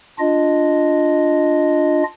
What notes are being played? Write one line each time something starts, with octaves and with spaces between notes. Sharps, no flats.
D4 F4 D#5